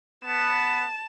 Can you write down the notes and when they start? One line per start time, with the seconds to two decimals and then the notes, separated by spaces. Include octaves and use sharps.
0.25 B3 A5 E7